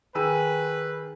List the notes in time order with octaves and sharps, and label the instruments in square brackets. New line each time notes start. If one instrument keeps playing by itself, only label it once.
[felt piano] D#3 E6 D#7 [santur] G#4 [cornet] B4